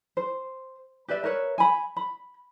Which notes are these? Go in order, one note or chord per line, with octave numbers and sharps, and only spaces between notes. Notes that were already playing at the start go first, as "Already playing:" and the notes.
C5
G4 B4 D5 E5
A#4 B4 C#5 E5
G#5 B5
B5